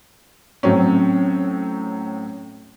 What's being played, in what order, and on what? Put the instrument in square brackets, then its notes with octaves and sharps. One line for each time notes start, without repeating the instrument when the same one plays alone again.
[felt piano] A2 F#3 C4 C#4